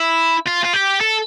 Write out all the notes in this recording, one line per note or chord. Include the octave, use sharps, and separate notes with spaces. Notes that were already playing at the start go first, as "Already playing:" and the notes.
Already playing: E4
F4
F4
G4
A4